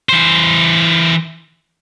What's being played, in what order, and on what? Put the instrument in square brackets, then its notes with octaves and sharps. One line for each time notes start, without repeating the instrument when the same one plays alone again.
[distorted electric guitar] E3 C5